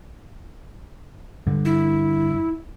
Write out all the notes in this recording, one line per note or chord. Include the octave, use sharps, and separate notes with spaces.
G2 D3
E4